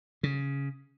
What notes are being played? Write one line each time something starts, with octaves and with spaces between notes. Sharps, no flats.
C#3